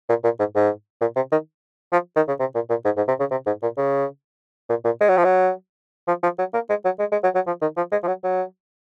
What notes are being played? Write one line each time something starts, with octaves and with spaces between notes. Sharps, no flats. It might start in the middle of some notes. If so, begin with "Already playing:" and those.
A#2
A#2
G#2
G#2
A#2
C3
D#3
F3
D#3
C#3
C3
A#2
A#2
G#2
G#2
C3
C#3
C3
G#2
A#2
C#3
A#2
A#2
G#3
F#3
F3
F#3
F3
F3
F#3
A#3
G#3
F#3
G#3
G#3
F#3
F#3
F3
D#3
F3
G#3
F3
F#3
F#3